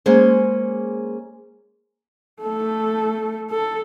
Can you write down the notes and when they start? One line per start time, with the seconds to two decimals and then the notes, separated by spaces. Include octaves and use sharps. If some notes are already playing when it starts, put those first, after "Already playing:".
0.06 G#3 A#3 C#4 G#4 C5
2.42 A3 A4
3.51 A4